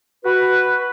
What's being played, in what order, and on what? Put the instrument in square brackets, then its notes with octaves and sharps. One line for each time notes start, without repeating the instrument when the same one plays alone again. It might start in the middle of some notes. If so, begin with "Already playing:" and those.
[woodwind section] F#4 B4